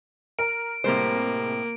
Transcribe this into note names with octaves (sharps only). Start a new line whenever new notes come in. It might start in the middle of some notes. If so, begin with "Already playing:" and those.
A#4 D7
A2 C3 G3 G#3 A#3 C5